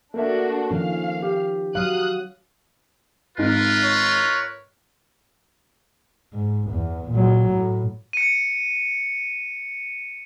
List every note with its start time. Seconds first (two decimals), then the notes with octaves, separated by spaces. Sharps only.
0.14 A3 A#3 D4 F#4 E5
0.71 D#3 F3 C#4 F5
1.22 G4
1.75 F#3 F5 D#6 F#6
3.38 G#1 G#2 F4 A#4 B4
3.83 C#5
6.33 G#2
6.71 E2
7.11 A#2 F#3
7.51 A2
8.13 C#7 D#7